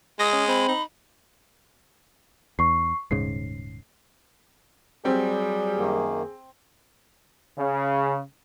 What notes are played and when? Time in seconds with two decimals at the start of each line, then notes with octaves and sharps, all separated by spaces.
0.20 G#3 D#6 A#6
0.33 C#4
0.48 C4 B5
0.68 D#4
2.59 E2 C#6 C7
3.11 D#1 G#2 C#3 C7
5.05 F#3 G3 C4 G#4
5.77 F#2 D#3 A#3
7.57 C#3